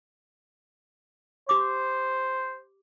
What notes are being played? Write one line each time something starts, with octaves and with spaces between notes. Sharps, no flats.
G4 C5 D6